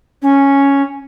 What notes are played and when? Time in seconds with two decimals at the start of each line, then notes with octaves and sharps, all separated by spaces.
0.22 C#4